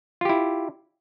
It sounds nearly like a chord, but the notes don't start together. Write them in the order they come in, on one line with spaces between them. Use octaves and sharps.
F4 G4 E4